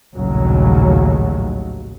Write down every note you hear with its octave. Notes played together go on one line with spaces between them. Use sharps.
A#1 D#2 A2 C#3 F#3